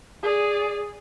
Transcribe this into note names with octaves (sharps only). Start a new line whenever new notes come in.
G#4 D5